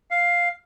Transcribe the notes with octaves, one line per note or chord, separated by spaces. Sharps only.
F5